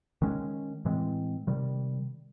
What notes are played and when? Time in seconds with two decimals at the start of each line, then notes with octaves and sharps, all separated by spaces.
0.22 D#3 G#3 C#4
0.85 A2 E3 G#3 C4
1.47 C3 D#3 G3